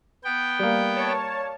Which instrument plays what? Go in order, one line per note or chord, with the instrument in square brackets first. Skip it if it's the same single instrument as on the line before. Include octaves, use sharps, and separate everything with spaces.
[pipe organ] B3 G5
[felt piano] G3 A#3
[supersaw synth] C#5 A5